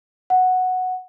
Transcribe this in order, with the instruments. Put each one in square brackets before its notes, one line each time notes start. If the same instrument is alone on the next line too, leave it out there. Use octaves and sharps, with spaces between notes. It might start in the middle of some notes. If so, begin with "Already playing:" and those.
[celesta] F#5